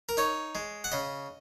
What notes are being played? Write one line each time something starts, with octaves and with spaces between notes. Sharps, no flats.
A#4
D#4 C#5
G#3
F#5
C#3 D#5